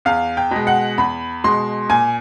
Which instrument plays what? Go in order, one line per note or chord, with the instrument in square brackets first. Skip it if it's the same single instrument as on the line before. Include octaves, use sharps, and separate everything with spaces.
[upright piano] E2 F5
G5
B2 G#3
F#5
E2 B5
B2 G#3 C6
A#2 G#5